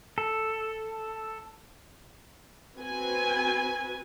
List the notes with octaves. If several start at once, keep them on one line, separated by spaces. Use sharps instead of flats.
A4
C4 F#4 B4 G#5